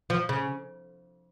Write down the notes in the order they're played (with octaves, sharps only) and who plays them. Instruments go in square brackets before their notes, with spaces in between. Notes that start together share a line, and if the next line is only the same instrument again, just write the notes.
[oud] F3
C#3